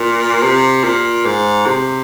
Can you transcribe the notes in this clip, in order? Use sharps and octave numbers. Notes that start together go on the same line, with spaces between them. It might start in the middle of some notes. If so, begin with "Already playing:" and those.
Already playing: A#2
C3
A#2
G#2
C3